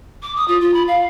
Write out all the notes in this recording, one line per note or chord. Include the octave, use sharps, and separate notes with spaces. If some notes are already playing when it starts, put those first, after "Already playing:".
D6
D#6
F4
F4
B5
F5